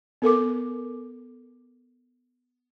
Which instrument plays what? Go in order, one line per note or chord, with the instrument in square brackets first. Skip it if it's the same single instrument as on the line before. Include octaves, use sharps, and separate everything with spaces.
[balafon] B3 A4 A#4 D6